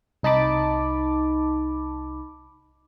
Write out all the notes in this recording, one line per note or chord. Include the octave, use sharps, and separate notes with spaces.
C2 D#4 A5 B5 D6